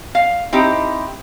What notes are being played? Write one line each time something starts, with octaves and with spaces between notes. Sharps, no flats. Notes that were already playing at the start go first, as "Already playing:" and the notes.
F5
C4 D#4 E4 G4